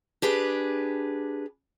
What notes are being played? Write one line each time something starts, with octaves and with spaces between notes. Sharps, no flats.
D4 G4 G#4 B4